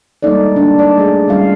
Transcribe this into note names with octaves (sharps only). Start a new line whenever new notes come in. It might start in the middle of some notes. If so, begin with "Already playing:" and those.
G3 G#3 A#3 D#4 A4 D5
A#3 D4
D#4 D5
A3 D#4 G#4
G3 C#4 F4 F5